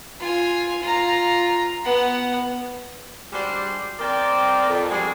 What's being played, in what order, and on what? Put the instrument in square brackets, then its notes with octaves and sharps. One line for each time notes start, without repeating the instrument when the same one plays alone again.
[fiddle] F4 G#5
F4 A#5
B3 F#5
[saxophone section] G3 G#3 D4 F#4 G4 C5
D#3 C4 A#4 D5
F2
G3 G#3 D4 F#4 G#4